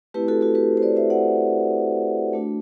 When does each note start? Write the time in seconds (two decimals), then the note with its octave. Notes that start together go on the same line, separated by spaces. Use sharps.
0.14 A3 C4 E4 G4 B4
0.28 F#4 A4
0.41 F#4 A4
0.55 G4 B4
0.77 C5
0.82 B4 D5
0.96 C5 E5
1.10 D5 F#5
2.33 A3 D4 F#4